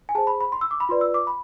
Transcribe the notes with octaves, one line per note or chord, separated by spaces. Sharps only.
G#5
G#4 C5 A5
B5
B5
C6
E6
D6
B5
F4 B4 D5 C6
E6
D6
B5